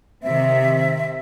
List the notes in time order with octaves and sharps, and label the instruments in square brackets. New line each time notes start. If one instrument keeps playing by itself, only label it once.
[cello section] C3 D#3 C4 [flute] E5